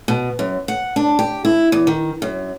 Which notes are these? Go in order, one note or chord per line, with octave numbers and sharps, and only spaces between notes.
B2
F#2
F#5
D4
G4
E4
E2
D#3
F#2